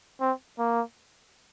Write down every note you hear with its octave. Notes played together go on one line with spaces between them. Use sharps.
C4
A#3